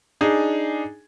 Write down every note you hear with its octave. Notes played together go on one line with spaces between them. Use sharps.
D4 D#4 G#4 G#5